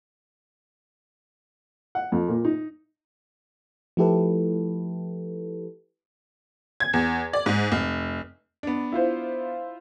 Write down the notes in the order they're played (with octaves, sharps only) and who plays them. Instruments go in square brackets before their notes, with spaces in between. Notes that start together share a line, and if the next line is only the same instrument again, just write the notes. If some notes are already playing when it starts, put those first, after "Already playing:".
[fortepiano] F#5
F2
A#2
D#4
[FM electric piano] F3 A3 E4 G4 A4 B4
[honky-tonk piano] G#6
E2
D5
G#2
F1
[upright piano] B3 D4
[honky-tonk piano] E4 F4 C5